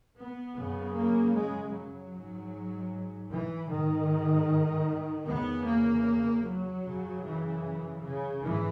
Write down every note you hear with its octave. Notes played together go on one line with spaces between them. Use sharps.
B3
F#2 C#3
A#3
G#3
F#3
G#2
E3
G#2 D#3
E2 C#3 B3
A#3
F#3
F#2 C#3
E3
C#3
G#2 E3